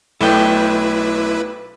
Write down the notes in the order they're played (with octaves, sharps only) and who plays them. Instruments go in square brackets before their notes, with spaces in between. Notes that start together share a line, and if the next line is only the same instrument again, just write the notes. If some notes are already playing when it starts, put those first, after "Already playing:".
[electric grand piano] B1 A3 D5 [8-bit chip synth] E4 B4 [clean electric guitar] A4 G5